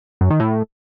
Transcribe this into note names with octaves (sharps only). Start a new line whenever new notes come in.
F#2
D#3
A2